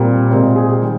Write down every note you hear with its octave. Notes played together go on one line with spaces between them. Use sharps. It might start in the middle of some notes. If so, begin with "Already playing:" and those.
Already playing: A#2 G3 C4 A#4
A#2 G#3 C4 A#4
G#4
G4
D#3 G3